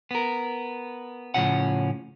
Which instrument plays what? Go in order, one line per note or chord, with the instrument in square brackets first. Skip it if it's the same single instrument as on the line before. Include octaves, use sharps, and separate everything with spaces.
[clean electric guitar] B3 A#4
A2 C#3 E3 F3 C#4 F#5